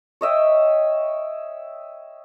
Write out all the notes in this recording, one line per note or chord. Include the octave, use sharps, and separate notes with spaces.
C#5 D#5 E5 G5